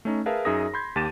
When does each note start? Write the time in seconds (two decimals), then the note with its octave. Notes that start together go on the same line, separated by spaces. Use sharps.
0.05 A3 C#4 D#4
0.26 G#4 A#4 B4 E5 F5 A5
0.45 F#2 D#4 G#4 E5 D#6 A#6
0.74 B5 C6 G6 G#6
0.96 D#2 G4 A5 A6 D#7 E7